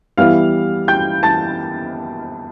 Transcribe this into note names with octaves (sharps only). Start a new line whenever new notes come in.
E3 G3 B3 E4 F5 F6
G5 G6
A5 A6